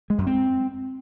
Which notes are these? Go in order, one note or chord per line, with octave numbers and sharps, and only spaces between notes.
G#3
F#2
C4